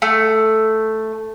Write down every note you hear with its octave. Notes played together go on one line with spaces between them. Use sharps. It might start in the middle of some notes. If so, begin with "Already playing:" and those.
A3